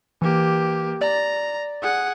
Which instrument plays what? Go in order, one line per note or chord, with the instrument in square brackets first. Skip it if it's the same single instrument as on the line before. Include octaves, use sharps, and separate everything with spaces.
[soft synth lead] E3 [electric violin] A#3 G4
[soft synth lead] D5 [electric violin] A#5
[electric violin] G#4 F#5